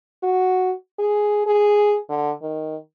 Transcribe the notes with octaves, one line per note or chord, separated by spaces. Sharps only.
F#4
G#4
G#4
D3
D#3